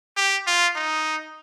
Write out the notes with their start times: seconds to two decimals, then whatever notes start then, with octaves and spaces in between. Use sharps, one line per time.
0.17 G4
0.47 F4
0.76 D#4